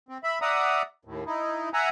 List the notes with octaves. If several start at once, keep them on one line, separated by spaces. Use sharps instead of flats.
C4
E5 B5
D5 E5 F#5 A#5 D#6
D#2 A2
D#4 E4
E5 F#5 G#5 A#5